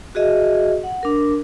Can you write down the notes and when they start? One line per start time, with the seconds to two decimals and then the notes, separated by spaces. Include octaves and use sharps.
0.15 F#4 G#4 D#5 E5
0.83 F#5
1.03 D4 A#4